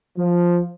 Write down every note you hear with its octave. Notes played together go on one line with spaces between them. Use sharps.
F3